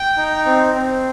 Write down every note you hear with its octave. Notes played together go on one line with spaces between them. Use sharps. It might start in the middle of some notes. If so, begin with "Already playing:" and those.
Already playing: G5
D#4
C4
C4